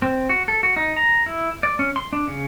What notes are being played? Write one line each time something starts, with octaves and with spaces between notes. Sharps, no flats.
C4
F#4
A4
F#4
D#4
A#5
E4
D5
C#4
C6
D4
C#3